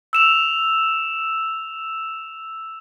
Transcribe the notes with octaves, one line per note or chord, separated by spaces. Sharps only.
E6 E7 F7